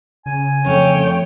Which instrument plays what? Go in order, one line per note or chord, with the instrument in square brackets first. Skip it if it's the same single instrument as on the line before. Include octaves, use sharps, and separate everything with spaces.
[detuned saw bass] C#3 [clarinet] G#5
[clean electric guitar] F2 A3 [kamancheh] C#5 G5